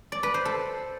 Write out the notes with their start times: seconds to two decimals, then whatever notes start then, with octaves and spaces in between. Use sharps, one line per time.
0.12 D5
0.23 B4
0.34 C5
0.45 A4